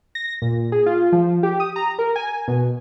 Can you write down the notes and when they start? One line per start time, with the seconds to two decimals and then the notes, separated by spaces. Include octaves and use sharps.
0.15 A#6
0.42 A#2
0.72 G#4
0.86 F4
1.12 F3
1.43 G4
1.60 D#6
1.76 A#5
1.99 A#4
2.16 G#5
2.48 B2